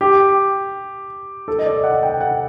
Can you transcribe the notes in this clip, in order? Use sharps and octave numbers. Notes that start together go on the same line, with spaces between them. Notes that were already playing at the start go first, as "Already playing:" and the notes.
G4
A4
D#5
D5
F#5
G5
F#5